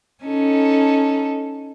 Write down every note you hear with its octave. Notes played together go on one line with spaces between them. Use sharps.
C#4 D#4 A4